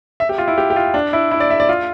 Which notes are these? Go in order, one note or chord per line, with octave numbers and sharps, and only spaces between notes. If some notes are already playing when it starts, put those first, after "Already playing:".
E5
G4
F4
E4
G4
G4
F4
D4
E4
E4
D5
E5
D5
F4